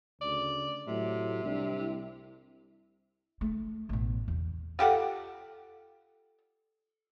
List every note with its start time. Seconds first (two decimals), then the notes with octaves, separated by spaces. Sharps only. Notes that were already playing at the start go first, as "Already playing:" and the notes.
0.21 D2 C#3 D5
0.87 A2 C3 F#3
1.44 C2 D4
1.80 E4
3.41 A3
3.89 A1 B2
4.28 E2
4.79 F4 G4 A4 F#5